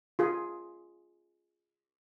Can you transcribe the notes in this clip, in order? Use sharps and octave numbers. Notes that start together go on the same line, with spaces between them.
F4 G#4